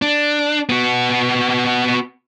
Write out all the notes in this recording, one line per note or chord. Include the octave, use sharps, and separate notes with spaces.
D4
B3 F#4